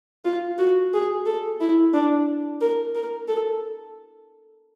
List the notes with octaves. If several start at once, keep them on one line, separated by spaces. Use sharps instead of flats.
F4
F#4
G#4
A4
E4
D4
A#4
A#4
A4